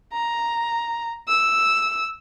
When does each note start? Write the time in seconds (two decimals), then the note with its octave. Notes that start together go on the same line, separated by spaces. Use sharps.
0.13 A#5
1.29 E6